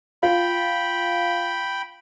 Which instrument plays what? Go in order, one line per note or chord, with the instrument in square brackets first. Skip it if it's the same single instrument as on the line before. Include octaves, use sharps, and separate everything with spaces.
[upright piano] F4 [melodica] G5 B5